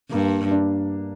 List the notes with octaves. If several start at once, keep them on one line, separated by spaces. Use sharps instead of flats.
G2 A#3
D4